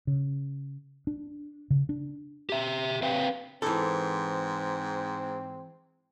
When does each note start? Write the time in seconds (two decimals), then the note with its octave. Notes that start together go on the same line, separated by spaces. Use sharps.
0.07 C#3
1.07 D4
1.70 C#3
1.89 D4
2.49 G4 E5
3.02 C4 B4 F5 G5
3.62 G#2 E3 C4 A4